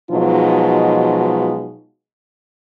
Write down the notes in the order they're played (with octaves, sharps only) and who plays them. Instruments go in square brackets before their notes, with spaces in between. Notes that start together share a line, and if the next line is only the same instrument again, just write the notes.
[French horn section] B2 F3 F#3 G#3 D#4 F4